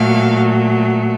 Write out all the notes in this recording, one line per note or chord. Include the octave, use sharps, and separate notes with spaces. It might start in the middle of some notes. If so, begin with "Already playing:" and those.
Already playing: A#2 F#3 A3 F5